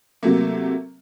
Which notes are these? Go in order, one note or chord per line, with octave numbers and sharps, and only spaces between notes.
C3 F#3 A3 A#3